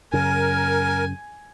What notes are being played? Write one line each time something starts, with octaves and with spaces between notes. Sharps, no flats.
F#2 C#3 A#4 G#5